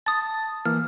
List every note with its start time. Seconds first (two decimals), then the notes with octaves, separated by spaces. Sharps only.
0.06 A5 D#6 A6
0.65 E3 A#3 F6